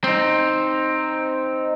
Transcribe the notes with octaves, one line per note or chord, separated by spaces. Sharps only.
C4 D#4